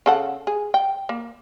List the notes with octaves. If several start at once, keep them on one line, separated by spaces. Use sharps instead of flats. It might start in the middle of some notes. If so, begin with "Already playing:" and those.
C#3 A4 F#5
G#4
G5
A#3